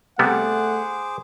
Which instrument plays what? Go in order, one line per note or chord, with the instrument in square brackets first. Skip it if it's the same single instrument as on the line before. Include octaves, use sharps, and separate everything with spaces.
[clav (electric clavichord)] C3 G3 B3 [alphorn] A3 [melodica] G#4 C5 D6 [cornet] F#5